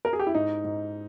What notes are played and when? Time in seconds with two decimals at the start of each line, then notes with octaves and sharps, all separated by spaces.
0.05 A#4
0.13 G#4
0.19 G4
0.27 E4
0.34 G#2 D#4
0.64 G#2